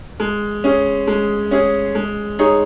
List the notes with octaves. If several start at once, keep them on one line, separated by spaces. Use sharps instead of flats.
G#3
C#4 G#4
G#3
C#4 G#4
G#3
D#4 G#4 C#5